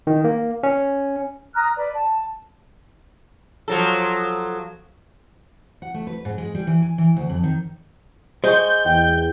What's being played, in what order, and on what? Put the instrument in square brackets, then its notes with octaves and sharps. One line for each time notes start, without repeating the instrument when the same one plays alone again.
[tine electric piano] D#3
A#3
C#4
[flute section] A#5 D#6 F6 F#6
B4 D5
A5
[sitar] F3 F#3 A4
[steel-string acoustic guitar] F#5
A3
B4
G#2
G#3
G3
E3
G#5
E3
D2
F2
D#3
[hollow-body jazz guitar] G#3 [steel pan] C5 C#6 [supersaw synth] G6
[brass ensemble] E2 [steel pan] G5